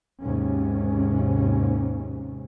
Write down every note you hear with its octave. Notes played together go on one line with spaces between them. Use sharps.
D#2 G#2 C3 C#4